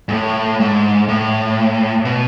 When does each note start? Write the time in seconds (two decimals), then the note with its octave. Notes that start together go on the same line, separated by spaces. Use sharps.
0.09 G#2
0.12 A2
0.60 G#2
1.09 A2
2.05 B2